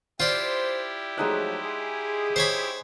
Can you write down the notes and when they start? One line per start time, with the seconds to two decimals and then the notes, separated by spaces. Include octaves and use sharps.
0.20 E4 F4 G4 C5 D5
1.18 F3 F#3 G#3 A3 D#4 F#5
1.63 G#4
2.36 C5 C#5 B5